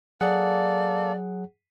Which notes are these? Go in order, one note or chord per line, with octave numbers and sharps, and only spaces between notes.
F#3 A#3 G#4 A4 D5 F#5